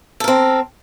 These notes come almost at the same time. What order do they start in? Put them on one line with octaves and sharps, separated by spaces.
A4 A#4 C4